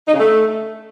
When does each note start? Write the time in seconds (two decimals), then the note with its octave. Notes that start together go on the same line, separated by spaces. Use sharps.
0.08 D#4
0.13 C#3
0.19 A3